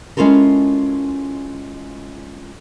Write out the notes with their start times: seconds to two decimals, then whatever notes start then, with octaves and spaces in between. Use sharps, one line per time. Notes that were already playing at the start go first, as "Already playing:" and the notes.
0.17 G#3 C#4 E4 F4 A4 A#4